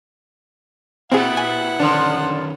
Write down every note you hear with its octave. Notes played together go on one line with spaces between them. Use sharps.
A#2 B3 C4 E4 G4 G#4 F#5
G#5
D3 D#3 F3 C#4 D4 B4